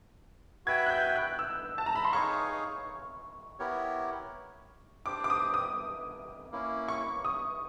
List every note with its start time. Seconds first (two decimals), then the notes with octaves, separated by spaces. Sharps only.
0.66 F#4 B4 E5 G5 G#6
0.86 F#6
0.90 G6
1.16 F#6
1.39 E6
1.78 A5
1.86 A#5
1.95 B5
2.05 C6
2.13 D#4 G#4 C#5 F5 C#6
3.59 B3 E4 G4 A#4 C#5
5.05 D4 G4 C5 D6
5.24 D6
5.30 D#6
5.54 D#6
6.52 A#3 C#4 E4
6.88 C#6
7.25 D#6